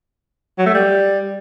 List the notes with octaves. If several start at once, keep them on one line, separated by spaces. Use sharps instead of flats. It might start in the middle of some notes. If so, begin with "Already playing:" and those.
F#3
A3
G3